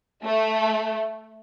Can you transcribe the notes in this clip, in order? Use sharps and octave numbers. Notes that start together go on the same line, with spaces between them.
A3